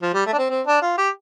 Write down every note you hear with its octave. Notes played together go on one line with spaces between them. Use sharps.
F3
G3
A3
D4
C4
C4
D4
F4
G4